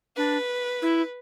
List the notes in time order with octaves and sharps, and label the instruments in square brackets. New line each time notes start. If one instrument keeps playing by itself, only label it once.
[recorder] D4 [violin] B4
[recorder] E4